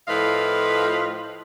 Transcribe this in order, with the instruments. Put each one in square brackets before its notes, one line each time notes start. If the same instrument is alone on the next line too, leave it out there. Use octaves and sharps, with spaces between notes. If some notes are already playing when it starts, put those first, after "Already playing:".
[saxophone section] A2 F3 F4 B4 D#5 F5